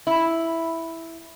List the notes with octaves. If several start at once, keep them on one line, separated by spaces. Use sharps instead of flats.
E4